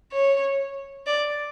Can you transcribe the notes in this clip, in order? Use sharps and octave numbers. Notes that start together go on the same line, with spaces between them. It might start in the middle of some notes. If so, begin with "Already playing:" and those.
C#5
D5